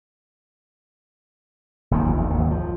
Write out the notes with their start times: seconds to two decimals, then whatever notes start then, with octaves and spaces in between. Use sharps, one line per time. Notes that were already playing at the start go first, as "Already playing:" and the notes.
1.91 F#1 D#2 D#3 F3
2.17 D2
2.30 G#1 D#2
2.51 F3